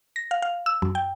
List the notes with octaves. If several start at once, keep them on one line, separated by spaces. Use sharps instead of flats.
A#6
F5
F5
E6
F#2
G5